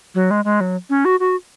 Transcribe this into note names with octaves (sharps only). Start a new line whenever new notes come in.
F#3
G#3
G#3
F#3
C#4
F#4
F#4